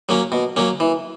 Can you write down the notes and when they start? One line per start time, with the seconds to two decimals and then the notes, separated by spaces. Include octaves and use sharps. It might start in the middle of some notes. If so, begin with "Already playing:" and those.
0.09 F#3 A#3 C#4
0.32 B2
0.56 F#3 A#3 C#4
0.80 E3